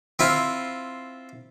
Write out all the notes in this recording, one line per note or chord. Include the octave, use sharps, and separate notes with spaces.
C4 E4 F4